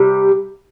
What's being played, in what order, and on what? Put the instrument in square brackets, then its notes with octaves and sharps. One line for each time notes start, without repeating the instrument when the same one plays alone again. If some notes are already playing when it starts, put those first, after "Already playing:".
Already playing: [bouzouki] C3 G3